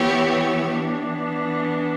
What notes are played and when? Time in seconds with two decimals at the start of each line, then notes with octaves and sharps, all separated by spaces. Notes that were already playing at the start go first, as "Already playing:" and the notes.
Already playing: E3 B3 E4 G4 C#5
0.71 E3 B3 D4